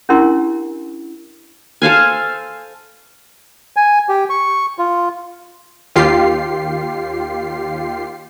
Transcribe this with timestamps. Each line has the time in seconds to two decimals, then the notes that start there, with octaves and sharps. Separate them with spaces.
0.09 C#4 D4 E4 G4 A#4 C6
1.82 A4 C5 F5 G#5
3.76 G#5
4.09 G4
4.30 C#6
4.79 F4
5.96 D#2 F4 G4 C7